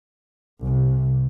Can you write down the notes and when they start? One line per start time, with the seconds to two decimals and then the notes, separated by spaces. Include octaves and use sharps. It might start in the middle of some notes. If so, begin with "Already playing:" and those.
0.60 C2 C3